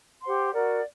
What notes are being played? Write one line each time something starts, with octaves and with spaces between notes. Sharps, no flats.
G4 C5 F#5 C6
F#4 A#4 D5 F#5